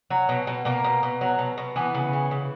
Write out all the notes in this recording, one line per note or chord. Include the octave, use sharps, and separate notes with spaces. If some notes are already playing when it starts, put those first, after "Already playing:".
F#3
B2
B2
B2 A#3
B2
B2
F#3
B2
B2
E3 B3
C#3
E3
C#3